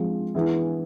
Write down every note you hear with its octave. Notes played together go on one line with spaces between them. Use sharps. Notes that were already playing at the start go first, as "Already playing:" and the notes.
Already playing: F3 G#3 C4 G#4
E3 B3 E4 G#4